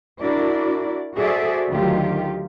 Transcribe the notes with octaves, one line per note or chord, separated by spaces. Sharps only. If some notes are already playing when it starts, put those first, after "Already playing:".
D4 E4 F#4 A#4 D5
F#4 G#4 A4 C5 D5 E5
D2 D#3 F#3 F4 G4